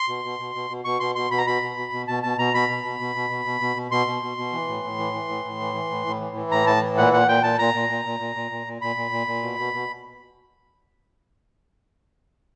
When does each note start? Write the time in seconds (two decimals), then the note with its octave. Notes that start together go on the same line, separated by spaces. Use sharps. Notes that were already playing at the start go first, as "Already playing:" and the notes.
Already playing: C6
0.09 B2
0.24 B2
0.39 B2
0.55 B2
0.70 B2
0.84 B2 C#6
1.00 B2 C6
1.15 B2 C6
1.31 B2 B5
1.38 A#5
1.46 B2 B5
1.62 B2
1.77 B2
1.92 B2
2.08 B2 A5
2.23 B2 A5
2.38 B2 A#5
2.54 B2 B5
2.69 B2
2.84 B2
3.00 B2
3.15 B2
3.30 B2
3.45 B2
3.60 B2
3.76 B2
3.91 B2 C6
4.07 B2
4.22 B2
4.37 B2
4.53 E3
4.68 A2
4.84 A2
4.98 E3
5.13 E3
5.29 A2
5.44 A2
5.60 E3
5.74 E3
5.91 A2
6.06 A2
6.20 E3
6.36 E3
6.52 A2 A#5
6.67 A2 A5
6.83 E3
6.97 A#2 F#5
7.13 A#2 F#5
7.28 A#2 G5
7.43 A#2 A5
7.59 A#2 A#5
7.74 A#2
7.89 A#2
8.05 A#2
8.20 A#2
8.36 A#2
8.51 A#2
8.67 A#2
8.81 A#2 B5
8.96 A#2
9.11 A#2
9.27 A#2
9.43 B2
9.58 B2
9.74 B2